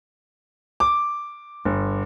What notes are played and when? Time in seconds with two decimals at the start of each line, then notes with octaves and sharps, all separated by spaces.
0.80 D6
1.65 G1